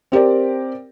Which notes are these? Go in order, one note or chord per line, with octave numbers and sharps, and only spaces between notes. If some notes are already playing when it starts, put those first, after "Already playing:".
C4 G4 A#4 D5